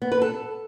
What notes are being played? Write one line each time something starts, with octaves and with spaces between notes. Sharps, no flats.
B3
B4
A4